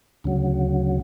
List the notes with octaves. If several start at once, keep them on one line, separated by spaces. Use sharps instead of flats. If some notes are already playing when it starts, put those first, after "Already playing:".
D2 C#3 F#3